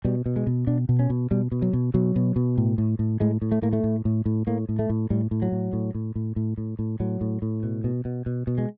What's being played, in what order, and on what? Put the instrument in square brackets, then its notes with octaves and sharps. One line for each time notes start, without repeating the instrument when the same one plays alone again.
[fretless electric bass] B2 G3
B2
G#3
B2
B2 D4
B2
C#4
B2
B2 G3
B2
F#3
B2
B2 F#3
B2
B2
A2
A2
A2
A2 G#3
A2
A3
A2 A#3
A3
A2
A2
A2
A2 A#3
A2
A3
A2
A2 G3
A2
F#3
A2
A2
A2
A2
A2
A2
A2
A2 F#3
A2
A2
B2
B2
B2
B2
B2
G#3